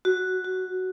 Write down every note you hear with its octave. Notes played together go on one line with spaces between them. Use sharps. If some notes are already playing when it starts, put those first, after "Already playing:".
F#4
F#4